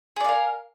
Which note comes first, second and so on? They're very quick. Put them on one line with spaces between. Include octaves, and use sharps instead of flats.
G#4 D5 F5 A#4